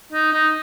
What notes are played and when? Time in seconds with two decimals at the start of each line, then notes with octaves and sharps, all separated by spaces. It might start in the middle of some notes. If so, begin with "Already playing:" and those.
0.13 D#4
0.33 D#4